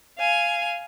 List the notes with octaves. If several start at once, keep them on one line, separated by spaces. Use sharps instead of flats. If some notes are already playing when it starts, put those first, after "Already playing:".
F5 G#5